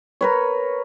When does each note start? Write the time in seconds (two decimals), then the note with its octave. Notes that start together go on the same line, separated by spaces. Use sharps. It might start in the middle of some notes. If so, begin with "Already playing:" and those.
0.21 A#4 B4 C#5